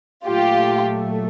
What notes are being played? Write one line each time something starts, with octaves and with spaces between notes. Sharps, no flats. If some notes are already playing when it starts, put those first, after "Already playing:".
A#2 F#3 A3 F4 G4